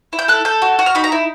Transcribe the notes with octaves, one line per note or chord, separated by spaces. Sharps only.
E4
G6
A4 F#6
A4 G6
F#4
F#4 F#6
F6
D#4 B5
A#5
E4